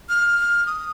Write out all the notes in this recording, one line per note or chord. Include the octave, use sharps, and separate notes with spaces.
F6
D#6